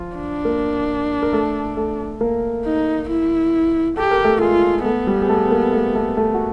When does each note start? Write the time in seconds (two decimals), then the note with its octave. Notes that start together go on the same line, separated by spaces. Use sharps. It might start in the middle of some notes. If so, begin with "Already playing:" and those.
Already playing: F3 F4
0.16 D4
0.45 A#3 A#4
1.22 A#4
1.33 A3 A4
1.77 A3 A4
2.21 A#3 A#4
2.65 D#4
3.09 E4
3.97 G4 A4
4.11 A#4
4.24 A3 A4
4.41 G#3 F4 G#4
4.85 A3 B3 A4
5.07 G3 G4
5.22 G#4
5.29 A3 A4
5.51 A#3 A#4
5.73 A3 A4
5.95 A3 A4
6.17 A3 A4
6.34 F#4